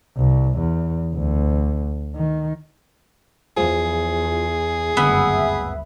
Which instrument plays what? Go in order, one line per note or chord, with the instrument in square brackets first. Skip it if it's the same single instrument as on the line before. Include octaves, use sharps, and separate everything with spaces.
[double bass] C2
E2
D2
D#3
[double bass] E2 [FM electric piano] F3 [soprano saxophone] G#4
[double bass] F#1 G2 [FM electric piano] D2 E5 B5 [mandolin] B3